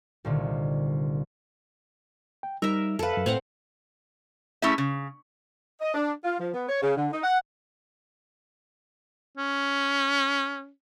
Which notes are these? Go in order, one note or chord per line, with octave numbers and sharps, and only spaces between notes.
C2 A#2 D3 D#3
G5
G3 D#4 A#4 E5 E6
F2 A4 B4 F5
F#2 F5
A2 C4 F5 F#5
A3 C#4 E4 G#4 E5
C#3
D#5
D4
F4
F3
B3
C#5
C#3
D3
D#4
F#5
C#4